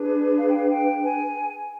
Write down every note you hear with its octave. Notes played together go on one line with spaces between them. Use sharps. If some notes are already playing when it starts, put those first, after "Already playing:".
Already playing: D4 G#4 B4
F5
G5
F5
G5
G#5